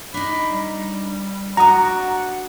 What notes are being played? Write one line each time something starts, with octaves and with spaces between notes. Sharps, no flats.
D4 D#4 B5
G3
D4 F#4 F#5 A#5 D#6